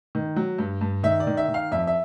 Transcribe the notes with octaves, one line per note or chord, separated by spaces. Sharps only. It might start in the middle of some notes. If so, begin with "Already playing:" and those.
D#3
F#3
G2
G2
D#3 E5
D5
D#3
E5
D#3
F5
F2 E5
E5